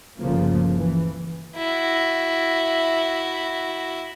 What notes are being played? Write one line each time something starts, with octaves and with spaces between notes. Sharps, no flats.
G1 D2 C#3 F3 A3 A#3
E3
E4 F#4